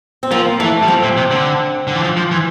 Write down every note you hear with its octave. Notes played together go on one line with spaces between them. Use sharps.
C4
F3 A#3
E3 A3
G3
F3 C4
A#2
C3
D3
D3
E3
F3
F3
E3